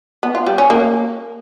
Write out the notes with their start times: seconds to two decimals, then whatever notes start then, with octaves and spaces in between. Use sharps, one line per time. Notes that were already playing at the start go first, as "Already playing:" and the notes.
0.23 B3
0.35 F4
0.46 G3
0.58 C#4
0.70 A#3